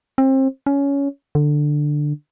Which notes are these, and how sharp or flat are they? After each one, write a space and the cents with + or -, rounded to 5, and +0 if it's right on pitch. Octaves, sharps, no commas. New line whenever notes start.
C4 +30
C#4 +15
D3 +10